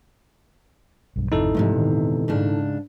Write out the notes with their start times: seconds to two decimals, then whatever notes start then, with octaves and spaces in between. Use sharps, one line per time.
1.16 B1 G2
1.32 G#1 F2 C3 D#4 E4 A4
1.55 E2 G#2 C3 F3 G#3 A3
1.75 A#2 D#3
2.28 G#2 C#3 D4